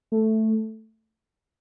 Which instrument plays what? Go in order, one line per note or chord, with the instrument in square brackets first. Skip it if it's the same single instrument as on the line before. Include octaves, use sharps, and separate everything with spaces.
[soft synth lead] A3